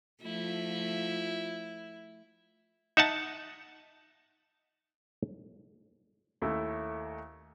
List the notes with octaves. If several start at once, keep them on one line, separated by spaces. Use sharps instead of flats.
F3 A3 E4 F4
D#4 E5 F#5 A5
D#2 A3 E4